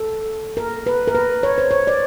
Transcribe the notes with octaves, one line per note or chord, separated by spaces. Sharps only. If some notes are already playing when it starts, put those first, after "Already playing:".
Already playing: A4
A#4
B4
A#4
B4
C#5
C5
C#5
D5